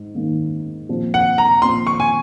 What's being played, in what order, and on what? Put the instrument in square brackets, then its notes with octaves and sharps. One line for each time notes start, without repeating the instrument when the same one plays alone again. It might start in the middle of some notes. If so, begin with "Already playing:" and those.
Already playing: [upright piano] G#2
G#2 D#3 A#3
A#2 F3 C4
[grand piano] F#5
A#5
[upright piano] A#2 F3 C4 [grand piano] C6
[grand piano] C#6
G#5